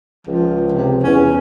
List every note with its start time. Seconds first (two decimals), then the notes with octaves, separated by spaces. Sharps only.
0.27 C#2 F3
0.72 C3
1.03 E2 C#4